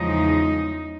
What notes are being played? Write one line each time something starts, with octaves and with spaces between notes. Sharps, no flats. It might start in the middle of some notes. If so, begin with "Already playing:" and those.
Already playing: E2 C#3 F3 G#3 D#4